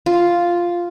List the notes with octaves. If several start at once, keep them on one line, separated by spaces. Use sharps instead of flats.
F4